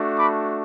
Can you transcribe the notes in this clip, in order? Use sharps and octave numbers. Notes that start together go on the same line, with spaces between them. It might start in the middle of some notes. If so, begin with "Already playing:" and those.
Already playing: A3 D4 F#4
B5 D6